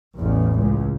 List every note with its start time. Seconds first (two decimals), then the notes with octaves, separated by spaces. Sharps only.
0.16 A1 E2
0.59 C#2